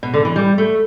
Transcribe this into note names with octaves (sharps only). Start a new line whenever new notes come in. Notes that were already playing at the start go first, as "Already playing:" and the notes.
B2
D3
E3
G3
A3